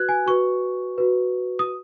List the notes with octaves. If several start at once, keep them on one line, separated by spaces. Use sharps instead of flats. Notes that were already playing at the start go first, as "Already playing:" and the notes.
Already playing: F#4 B4 F#6 G#6
G#5
F#4 B4 C#6
F#4 B4
D#6